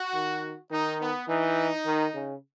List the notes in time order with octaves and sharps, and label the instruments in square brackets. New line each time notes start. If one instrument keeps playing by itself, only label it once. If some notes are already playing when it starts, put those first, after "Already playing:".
Already playing: [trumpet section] F#4
[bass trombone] D#3
[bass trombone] D#3 [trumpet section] D#4
[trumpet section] B3
[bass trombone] E3 [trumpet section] D#4
[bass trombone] D#3
C#3